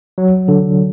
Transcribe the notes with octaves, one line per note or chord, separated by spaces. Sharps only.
F#3
D3